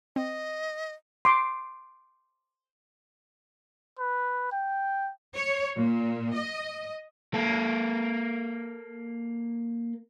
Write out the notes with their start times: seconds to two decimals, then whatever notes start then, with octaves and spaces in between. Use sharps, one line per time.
0.16 C4 D#5
1.25 C6 D6
3.99 B4
4.52 G5
5.34 C#5
5.77 A#2
6.35 D#5
7.34 A#3 A4